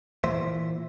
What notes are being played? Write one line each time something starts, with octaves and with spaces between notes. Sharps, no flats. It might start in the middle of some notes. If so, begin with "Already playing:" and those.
A#2 E3 C5 E5